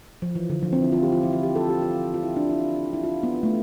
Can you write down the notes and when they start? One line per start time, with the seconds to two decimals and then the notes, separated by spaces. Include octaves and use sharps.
0.22 F3
0.35 E3
0.50 D3
0.63 F3
0.73 C4
0.82 E4
0.92 F4
1.03 G4
1.12 F4
1.23 E4
1.33 F4
1.43 G4
1.56 A4
1.69 G4
1.83 F4
2.14 F4
2.23 E4
2.36 D4
2.49 E4
2.93 E4
3.03 F4
3.23 B3
3.43 A3